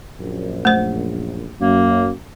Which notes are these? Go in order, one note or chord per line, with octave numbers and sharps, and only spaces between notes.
A#1 F#2
A3 C5
F#2 A#3